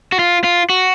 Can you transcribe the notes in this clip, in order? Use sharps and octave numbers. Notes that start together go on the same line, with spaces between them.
F#4
F4
F4
F#4